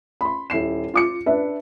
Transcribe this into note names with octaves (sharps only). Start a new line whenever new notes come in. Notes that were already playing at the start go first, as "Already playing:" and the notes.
B5 C6
D#1 E4 C7 E7
F4 D6 C#7
D4 B4 E5